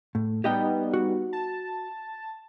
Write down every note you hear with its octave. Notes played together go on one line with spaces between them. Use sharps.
A2
G3 B3 D#4 G4 D#5 G5
F#4
A5